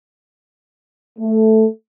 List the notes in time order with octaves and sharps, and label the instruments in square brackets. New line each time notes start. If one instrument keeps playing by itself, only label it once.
[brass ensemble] A3